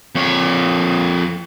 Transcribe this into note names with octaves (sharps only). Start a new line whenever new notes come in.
F2 C#5